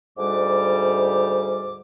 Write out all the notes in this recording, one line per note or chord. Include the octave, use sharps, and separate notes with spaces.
D2 G#2 G3 D6